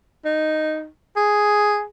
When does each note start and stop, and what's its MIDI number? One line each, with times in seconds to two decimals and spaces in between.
0.25 0.87 63
1.16 1.84 68